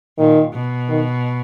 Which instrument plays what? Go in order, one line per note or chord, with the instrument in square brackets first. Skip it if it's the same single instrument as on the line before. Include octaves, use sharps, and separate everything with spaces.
[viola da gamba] A#2 [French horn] D#3
[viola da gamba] B2
[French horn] D#3